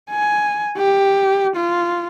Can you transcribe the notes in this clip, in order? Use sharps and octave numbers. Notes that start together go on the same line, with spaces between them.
G#5
G4
F4